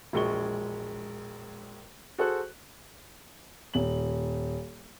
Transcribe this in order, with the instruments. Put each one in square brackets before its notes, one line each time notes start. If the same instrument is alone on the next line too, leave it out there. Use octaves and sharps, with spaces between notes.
[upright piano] E1 A#1 G#3 C#6 G7
F#4 G#4 A4 C5 F#6
D#1 F#7